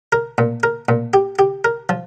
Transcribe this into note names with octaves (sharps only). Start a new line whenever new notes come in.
A#4
A#2
A#4
A#2
G4
G4
A#4
F3